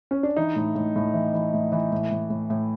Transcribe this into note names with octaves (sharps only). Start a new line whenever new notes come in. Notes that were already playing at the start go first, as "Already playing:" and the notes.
C#4
D4
E3 D#4
A2
A2
A2
E3
E3
A2
E3
A2
A2
A2
A2